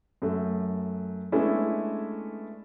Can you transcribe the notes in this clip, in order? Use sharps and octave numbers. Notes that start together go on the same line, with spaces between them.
F#2 A3
G#3 A3 B3 C#4 D4 E4